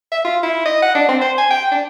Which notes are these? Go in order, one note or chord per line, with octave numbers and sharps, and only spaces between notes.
E5
F4
E4
D#5
F#5
D4
C4
C5
G#5
G5
D4